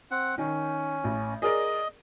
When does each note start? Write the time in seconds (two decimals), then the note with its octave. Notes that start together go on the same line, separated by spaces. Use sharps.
0.11 C4 F#5
0.38 D#3 C#4
1.04 A1
1.42 G#4 A#4 D5 D#5